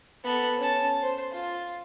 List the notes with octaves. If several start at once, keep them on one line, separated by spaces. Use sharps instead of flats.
B3 A4
C#4 A5
C5
F4